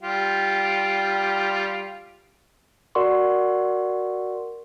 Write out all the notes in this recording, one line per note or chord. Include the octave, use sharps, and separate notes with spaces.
G3 F4 G4
F#4 A#4 D5 F#5 C6 C#6